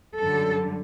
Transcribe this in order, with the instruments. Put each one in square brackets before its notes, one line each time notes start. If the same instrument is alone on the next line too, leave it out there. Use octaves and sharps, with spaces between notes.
[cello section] F#2 D3 G3 A4